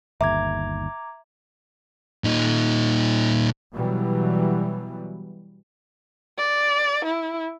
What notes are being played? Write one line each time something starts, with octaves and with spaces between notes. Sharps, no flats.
G1 D#2 E5 A#5 D6 G#6
A#2 D#4
B2 E3 F#3 G3
D5
E4